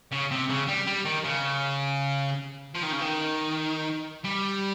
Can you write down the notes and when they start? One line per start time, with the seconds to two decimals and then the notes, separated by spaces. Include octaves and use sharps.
0.11 C#3
0.31 C3
0.49 C#3
0.68 G3
0.87 G3
1.05 D#3
1.25 C#3
2.74 F3
2.83 D#3
2.92 C#3
3.01 D#3
4.24 G3